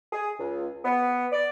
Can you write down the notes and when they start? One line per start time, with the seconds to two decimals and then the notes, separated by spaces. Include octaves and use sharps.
0.12 G#4
0.40 C#2
0.84 B3
1.32 D5